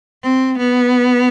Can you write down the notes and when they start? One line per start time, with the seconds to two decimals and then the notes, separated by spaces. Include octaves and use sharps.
0.23 C4
0.58 B3